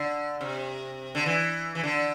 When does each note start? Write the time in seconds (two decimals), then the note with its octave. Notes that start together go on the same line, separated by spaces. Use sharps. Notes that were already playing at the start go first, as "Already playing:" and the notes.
Already playing: D3
0.41 C3
1.15 D3
1.26 E3
1.75 E3
1.83 D3